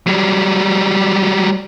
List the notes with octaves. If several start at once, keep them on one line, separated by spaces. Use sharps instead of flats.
F#3 G3